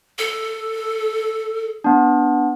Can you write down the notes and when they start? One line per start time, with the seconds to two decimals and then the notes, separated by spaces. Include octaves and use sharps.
0.18 A4
1.84 B3 D4